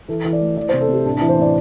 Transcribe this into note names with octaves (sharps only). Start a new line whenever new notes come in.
E3 A4
E3
D5
A3
E3 D5
C3 C5
A4
C3 G4
A2 D4
E3 D4
C5
A2 D5